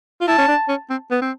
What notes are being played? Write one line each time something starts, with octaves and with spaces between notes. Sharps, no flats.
F4
E4 A5
C#4
D4
C#4
C4
B3
C4